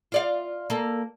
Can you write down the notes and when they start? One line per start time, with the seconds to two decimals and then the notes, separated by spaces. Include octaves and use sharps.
0.12 F4 D5 F5
0.70 A#3 A4